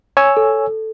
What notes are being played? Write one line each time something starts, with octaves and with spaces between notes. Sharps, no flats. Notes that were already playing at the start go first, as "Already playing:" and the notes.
C#5 G#5 E6
A4